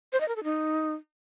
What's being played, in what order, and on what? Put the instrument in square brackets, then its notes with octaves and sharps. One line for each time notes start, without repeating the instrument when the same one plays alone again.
[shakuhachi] C5
D#5
A#4
A4
D#4